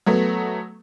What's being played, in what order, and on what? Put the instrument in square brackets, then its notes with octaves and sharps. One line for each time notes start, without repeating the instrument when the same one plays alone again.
[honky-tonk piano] F#3 A3 B3